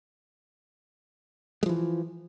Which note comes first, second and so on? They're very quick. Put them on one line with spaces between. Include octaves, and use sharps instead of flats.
G#3 F3 E3